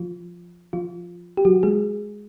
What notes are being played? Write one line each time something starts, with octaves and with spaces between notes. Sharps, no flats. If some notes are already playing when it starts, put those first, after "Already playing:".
Already playing: F3 F4
F3 F4
G4
F#3 F#4
G#3 G#4